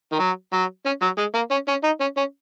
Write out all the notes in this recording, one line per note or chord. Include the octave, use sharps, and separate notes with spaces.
D#3
F#3
F#3
C#4
F#3
G#3
A#3
C#4
C#4
D#4
C#4
C#4